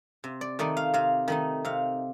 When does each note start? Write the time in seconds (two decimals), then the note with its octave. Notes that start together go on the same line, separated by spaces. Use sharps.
0.24 C3
0.41 D5
0.59 D#3 A3 D#4 D5
0.77 F5
0.94 C3 F5
1.28 D#3 A3 D#4
1.65 C3 F5